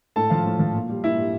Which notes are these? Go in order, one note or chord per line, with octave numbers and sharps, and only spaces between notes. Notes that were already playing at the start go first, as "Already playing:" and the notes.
A2 A4 A5
F3 F4 F5
A2
F3
A#2
G3
A#2 E4 E5
G3